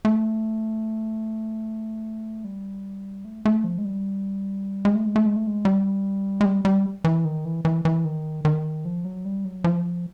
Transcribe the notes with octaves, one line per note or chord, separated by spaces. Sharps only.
A3
G3
A3
A3
F3
G#3
G3
G#3
A3
G#3
A3
G#3
A3
G#3
G3
G#3
G3
G3
E3
D#3
E3
E3
E3
D#3
D#3
F3
F#3
G3
F#3
F3